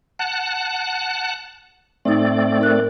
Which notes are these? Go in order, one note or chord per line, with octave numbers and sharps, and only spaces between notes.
F#5 A5 F#6
A2 A3 C4 D#4 D5
D#4 A#4 F#6